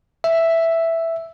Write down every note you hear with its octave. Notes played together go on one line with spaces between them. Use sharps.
E5